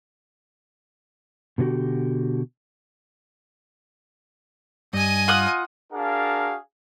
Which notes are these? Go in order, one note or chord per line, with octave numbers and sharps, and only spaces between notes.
B2 D3 B3 F#4 G4
G2 D#5 G#5
F4 F#5 D#6
D4 F#4 G#4 A#4 F5 A5